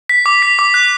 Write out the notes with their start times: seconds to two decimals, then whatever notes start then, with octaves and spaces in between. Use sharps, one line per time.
0.09 B6
0.26 D6
0.42 B6
0.59 D6
0.74 F#6